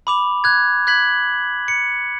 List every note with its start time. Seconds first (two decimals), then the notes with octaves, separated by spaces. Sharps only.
0.07 B5 D6 F7
0.44 F#6 G#6
0.87 F#6 G#6 B6 F#7
1.68 C#7